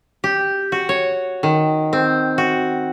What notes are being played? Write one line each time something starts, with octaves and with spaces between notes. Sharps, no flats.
G4
F#4
C#5
D#3
C4
F#4